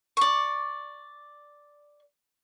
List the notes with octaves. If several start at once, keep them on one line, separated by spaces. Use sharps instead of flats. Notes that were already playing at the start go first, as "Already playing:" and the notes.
D5 C#6